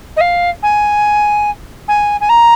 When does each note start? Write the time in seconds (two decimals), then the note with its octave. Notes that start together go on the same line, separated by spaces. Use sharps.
0.16 D#5
0.21 F5
0.63 G#5
1.88 G#5
2.21 G#5
2.29 A#5